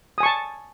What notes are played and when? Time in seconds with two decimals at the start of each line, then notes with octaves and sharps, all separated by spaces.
0.18 D#6
0.20 G#5
0.23 C#6
0.26 A5